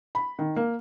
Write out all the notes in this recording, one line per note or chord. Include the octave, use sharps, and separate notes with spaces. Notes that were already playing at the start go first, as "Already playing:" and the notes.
B5
D#3
A#3